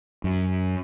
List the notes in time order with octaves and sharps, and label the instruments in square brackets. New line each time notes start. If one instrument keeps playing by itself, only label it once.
[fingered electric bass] F#2